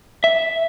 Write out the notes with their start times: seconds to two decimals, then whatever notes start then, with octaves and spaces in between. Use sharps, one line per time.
0.24 E5